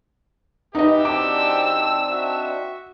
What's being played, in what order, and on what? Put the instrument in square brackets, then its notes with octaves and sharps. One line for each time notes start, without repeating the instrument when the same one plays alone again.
[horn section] E3 F#4 G4 [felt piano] D#4 D#5 [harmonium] B4 E5
[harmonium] C4 D4 D#4 [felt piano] D6 [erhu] E6
[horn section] F#4 E5